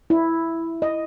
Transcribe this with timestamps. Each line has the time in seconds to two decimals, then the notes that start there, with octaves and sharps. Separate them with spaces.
0.10 E4
0.82 D#5